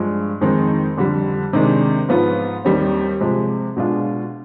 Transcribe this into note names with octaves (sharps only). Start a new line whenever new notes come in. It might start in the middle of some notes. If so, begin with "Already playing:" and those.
Already playing: G2 F3 G#3 D4
F2 D#3 G#3 C4 D#4
F2 D3 G3
C3 D#3 G#3 D4
G#2 F3 B3 F4
D#2 D#3 G3 C4
C3 F3 G#3
B2 G#3 D4 F4